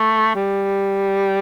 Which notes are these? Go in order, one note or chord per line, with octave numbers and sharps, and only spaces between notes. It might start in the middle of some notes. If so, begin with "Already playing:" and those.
Already playing: A3
G3